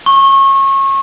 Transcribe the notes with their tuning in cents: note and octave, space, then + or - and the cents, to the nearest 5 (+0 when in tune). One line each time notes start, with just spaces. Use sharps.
C#6 -30